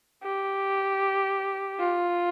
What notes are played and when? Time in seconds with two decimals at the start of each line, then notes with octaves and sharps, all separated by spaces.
0.23 G4
1.80 F4